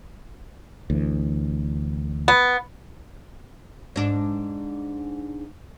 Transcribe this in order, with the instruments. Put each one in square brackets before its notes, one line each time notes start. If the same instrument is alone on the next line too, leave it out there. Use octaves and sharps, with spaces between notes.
[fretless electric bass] D2 E3
[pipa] B3
[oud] G#2 D4